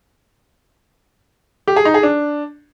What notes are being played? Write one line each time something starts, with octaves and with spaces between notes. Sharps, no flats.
G4
G#4
D#4
G#4
D4